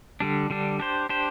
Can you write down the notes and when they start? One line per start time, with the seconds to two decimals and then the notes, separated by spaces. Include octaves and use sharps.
0.20 D3 G3 D4
0.50 D3 G3 D4
0.80 D4 G4 C5
1.09 D4 G4 C5